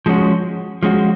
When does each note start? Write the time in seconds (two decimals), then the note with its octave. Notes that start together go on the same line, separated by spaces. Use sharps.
0.06 F3 G#3 C#4 F#4
0.83 F3 G#3 C#4 F#4